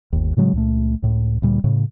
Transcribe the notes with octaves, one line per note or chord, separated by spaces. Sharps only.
G1 D#2
A2 C#3 F#3 G#3
C#2 A#2 A3
C#2 A2
D2 A#2 G3
A2 C#3